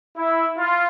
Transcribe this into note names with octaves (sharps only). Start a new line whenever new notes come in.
E4
F4